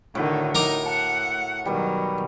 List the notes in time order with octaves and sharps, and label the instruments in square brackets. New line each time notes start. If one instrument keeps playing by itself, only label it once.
[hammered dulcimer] A2 F#4 [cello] D3 D#3
[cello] D#4 [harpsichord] A#4 A#5 D6
[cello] F#5 [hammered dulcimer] A5
[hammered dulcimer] B2 G3 [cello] D#3 F#3